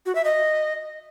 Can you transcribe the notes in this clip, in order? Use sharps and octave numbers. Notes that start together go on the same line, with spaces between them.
F#4
E5
D#5